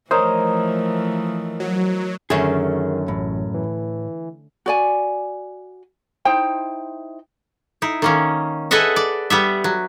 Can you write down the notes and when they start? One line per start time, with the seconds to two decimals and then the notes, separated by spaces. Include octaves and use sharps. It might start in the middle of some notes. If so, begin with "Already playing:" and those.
0.11 E3 F3 A3 A#4 C5 C#5 D#5
1.60 F#3
2.30 F#2 D3 D#3 A3 C#4 G#4
3.08 A1 A2
3.54 E3
4.66 F#4 D5 G#5
6.25 D#4 E4 C5 G5
7.82 D#4 E4
8.02 D#3 A#3 C#4
8.71 G#4 A4 B4 D#5 E5 F#5
8.96 D5
9.30 G3 B3 E5
9.64 F#3